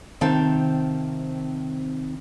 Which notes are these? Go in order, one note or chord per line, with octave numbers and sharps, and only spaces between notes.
C3 D#3 C4 F5 A5